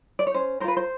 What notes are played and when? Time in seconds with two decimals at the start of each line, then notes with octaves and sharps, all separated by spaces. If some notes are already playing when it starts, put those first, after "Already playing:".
0.19 D5
0.27 C#5
0.34 C#4 C5
0.60 A#4 C5
0.64 F4 B4
0.77 C5